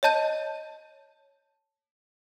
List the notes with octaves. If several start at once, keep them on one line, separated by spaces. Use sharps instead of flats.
C#5 D#5 A5 G6 D#7